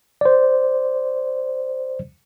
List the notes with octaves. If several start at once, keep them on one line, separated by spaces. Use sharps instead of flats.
C5 D5